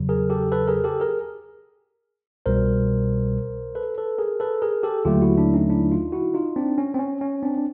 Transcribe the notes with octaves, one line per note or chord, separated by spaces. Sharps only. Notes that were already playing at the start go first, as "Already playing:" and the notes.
Already playing: E2 C#3 F#3
G#4 A#4
G4 A4
A4 B4
G#4 A#4
G4 A4
G#4 A#4
C2 B2 G3 A#4 C5
A4 B4
A4 B4
G#4 A#4
A4 B4
G#4 A#4
G4 A4
D#2 D3 F#3 A3 F4 G4
E4 F#4
D4 E4
C#4 D#4
D4 E4
D#4 F4
E4 F#4
D#4 F4
C4 D4
C#4
C4
C#4
C#4
C4 D4
D4